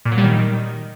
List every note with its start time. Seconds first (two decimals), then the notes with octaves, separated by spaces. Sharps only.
0.05 A#2
0.12 F#3
0.18 G3
0.24 D#3